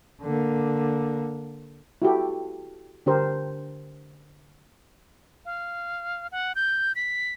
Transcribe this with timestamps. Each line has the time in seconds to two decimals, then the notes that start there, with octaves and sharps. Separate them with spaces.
0.22 D3 A#3
2.02 E4 F#4 G4 A4
3.06 D3 D4 G4 A#4 C5
5.45 F5
6.32 F#5
6.56 G6
6.95 B6